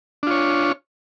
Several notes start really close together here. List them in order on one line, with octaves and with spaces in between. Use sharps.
D4 F4 C#5